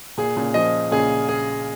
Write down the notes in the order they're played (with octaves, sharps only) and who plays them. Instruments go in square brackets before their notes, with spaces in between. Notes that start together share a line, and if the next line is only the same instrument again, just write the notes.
[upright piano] A#2 [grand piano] G#4
[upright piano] A#2 C#3
[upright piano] C#3 F3 [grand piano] D#5
[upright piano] A#2 C#3 [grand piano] G#4
[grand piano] G#4